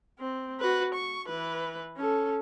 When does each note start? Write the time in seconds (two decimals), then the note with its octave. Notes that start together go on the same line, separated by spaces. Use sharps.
0.19 C4
0.60 F#4 B4
0.94 C#6
1.28 E3 B4
1.97 C#4 A4